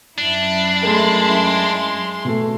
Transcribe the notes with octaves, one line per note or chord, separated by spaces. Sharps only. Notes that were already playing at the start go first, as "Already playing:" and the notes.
F#2 D4 E4
G#3 A3 A#4 C6
B2 A3